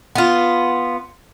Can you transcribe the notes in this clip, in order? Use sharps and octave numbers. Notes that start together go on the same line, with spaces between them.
B3 F4